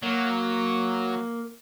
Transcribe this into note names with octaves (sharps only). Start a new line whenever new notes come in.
F#3 A#3